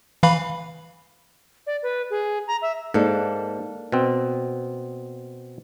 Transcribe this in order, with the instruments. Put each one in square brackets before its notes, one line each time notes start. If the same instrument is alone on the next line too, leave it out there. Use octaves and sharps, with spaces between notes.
[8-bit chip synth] E3 F5 B5
[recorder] D5
B4
G#4
A#5
E5
[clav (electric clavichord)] G#2 [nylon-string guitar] A#3 D4 A4
[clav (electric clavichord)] B2 C4